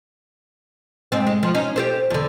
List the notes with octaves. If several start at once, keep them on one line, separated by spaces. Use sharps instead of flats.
G#2 C4
G#3
F3
C#4 D#4
G4 A4 C5
E2 D3